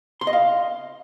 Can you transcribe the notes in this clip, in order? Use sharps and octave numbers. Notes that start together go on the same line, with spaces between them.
C6
D#5
F5